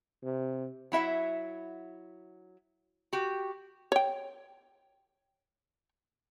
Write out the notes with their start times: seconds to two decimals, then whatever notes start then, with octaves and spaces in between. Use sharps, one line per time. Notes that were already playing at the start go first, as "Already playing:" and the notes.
0.23 C3
0.92 F#3 E4 E5 F#5
3.13 F#4 G4
3.92 C#5 G5